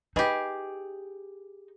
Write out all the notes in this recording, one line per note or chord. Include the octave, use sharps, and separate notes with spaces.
D#4 G4 G#4 B4 D#5 B5